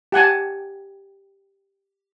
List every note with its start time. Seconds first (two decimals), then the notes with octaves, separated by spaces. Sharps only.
0.12 G4 F#5 G#5 A5